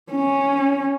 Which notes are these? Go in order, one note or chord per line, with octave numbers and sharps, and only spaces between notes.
C#4